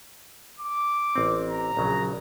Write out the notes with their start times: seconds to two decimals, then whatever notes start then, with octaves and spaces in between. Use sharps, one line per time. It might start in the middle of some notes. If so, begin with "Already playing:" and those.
0.60 D6
1.15 A1 C4
1.49 A#5
1.77 A#1 C#3 F#3